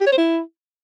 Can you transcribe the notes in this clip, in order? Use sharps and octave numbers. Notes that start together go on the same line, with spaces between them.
G4
C#5
C5
E4